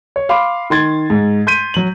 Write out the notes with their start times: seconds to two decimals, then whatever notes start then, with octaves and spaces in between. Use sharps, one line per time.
0.16 C#5
0.29 F5 B5 C6 D6
0.70 D#3 C6 G#6 A6
1.10 G#2
1.47 C6 G6 B6 D#7
1.74 F#3 F#7